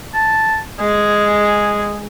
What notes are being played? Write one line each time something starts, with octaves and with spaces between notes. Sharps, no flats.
A5
G#3 G#4